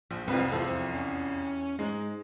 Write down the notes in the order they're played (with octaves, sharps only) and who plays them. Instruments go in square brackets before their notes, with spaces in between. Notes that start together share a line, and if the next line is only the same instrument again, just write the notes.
[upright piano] A#1 [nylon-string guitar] F3
[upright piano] C2 F2 F4 [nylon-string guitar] C4 B4
[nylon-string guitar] E2 A4 [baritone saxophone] F3
[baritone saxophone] C#4
[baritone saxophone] G#2 [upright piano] G#3